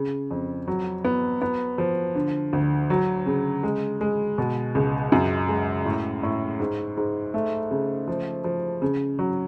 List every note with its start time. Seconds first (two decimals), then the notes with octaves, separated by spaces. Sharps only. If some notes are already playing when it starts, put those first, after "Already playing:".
Already playing: C#3
0.31 F2
0.68 F#3
1.04 B3
1.42 B3
1.78 F3
2.15 D3
2.53 D2
2.90 F#3
3.26 C#3
3.63 G#3
4.01 G#3
4.38 B2
4.75 C#2
5.12 F#2
5.49 G#3
5.85 A2
6.23 A2
6.60 G#2
6.97 G#2
7.34 A3
7.71 C#3
8.08 F3
8.44 F3
8.82 C#3
9.19 F#3